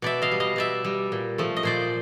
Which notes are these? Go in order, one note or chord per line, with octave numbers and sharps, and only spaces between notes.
B2 D5 E5
D#5 F5
G3
D#5 F5
B2 D5 E5
G3
A#2
F3 A3
D#5
A#2 C5 D5